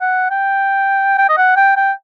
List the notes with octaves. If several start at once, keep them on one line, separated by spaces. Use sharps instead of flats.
F#5
G5
G5
D#5
F#5
G5
G5